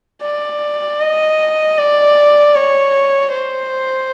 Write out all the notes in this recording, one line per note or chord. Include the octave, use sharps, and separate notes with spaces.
D5
D#5
D5
C#5
C5